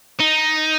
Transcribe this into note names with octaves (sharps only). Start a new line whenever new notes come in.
D#4